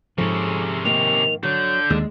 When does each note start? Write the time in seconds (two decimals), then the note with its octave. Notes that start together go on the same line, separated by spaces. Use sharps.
0.18 G#2 C3 F3 C#4 G#4 A4
0.85 D#3 A#3 F7
1.43 D3 F#3 G6
1.90 D#2 G#3